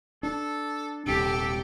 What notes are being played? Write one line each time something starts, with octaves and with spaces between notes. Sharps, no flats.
D4 A4
D#1 C2 C3 G4 A4